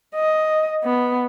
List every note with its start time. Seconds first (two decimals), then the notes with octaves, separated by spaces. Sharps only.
0.16 D#5
0.84 B3